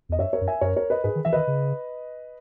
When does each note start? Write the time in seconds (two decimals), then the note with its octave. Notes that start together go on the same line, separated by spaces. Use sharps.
0.09 E2 D#5
0.19 F#2 C#5 E5
0.33 A#4 C#5
0.41 F#2
0.48 E5 G#5
0.61 F#2 A#4 C#5
0.76 A#4 C#5
0.90 B4 D#5
1.04 G#2 G#4 B4
1.15 D#3
1.25 E3 E5
1.33 D#3 B4 D#5
1.47 C#3